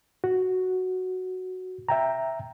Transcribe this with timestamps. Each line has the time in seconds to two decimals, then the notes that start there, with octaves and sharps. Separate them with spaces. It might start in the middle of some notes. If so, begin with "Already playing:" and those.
0.24 F#4
1.89 E5 G5 A#5